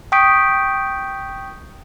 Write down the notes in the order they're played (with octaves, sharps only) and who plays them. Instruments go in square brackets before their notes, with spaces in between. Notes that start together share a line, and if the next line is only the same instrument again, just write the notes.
[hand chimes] G5 C#6 D#6 G6 B6 D7